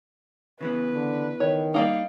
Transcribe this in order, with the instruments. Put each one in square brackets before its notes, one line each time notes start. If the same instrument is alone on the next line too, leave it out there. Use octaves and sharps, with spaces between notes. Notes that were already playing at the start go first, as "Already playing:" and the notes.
[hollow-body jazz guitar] C#3 E3 B3 [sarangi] B4
[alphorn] D3
[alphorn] D#3 [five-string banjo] C#5
[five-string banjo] G3 A#3 D#4 [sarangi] F5